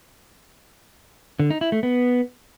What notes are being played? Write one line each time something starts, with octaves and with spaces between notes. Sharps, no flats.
D3
D#4
E4
A3
B3